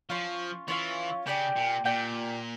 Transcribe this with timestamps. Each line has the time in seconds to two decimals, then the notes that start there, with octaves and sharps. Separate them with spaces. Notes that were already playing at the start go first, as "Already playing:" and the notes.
0.10 F3 C#4 F4 C#5 F5
0.68 E3 C#4 F4 C#5 F5
1.26 C#3 G4 D5 G5
1.56 A#2
1.85 A#2 G4 D5 G5